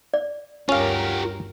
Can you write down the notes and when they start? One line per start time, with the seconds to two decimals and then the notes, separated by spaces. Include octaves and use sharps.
0.14 D5
0.69 G1 D2 C#4 F4 G4 A#4 F5